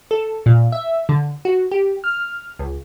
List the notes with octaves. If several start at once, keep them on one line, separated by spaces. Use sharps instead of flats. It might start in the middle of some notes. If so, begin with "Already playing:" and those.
A4
A#2
E5
D3
F#4
G4
F6
C#2